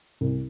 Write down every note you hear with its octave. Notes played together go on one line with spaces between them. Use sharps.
C2